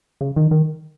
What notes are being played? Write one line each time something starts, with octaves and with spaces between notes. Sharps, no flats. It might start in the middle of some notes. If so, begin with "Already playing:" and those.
C#3
D#3
D#3